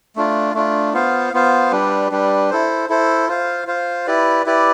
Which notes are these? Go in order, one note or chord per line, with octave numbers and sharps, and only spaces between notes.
A3 D4 F4
A3 D4 F4
B3 F4 C5 F5
B3 F4 C5 F5
G3 D4 G4 B4
G3 D4 G4 B4
E4 A4 C5
E4 A4 C5
F4 C5 F5
F4 C5 F5
E4 G4 B4 D5
E4 G4 B4 D5